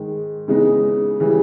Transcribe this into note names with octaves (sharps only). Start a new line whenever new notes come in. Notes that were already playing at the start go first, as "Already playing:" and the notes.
Already playing: G#2 D#3 G#3
C#3 E3 G#3 B3 D#4
C#3 E3 G3